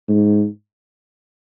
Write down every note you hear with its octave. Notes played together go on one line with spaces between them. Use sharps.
G#2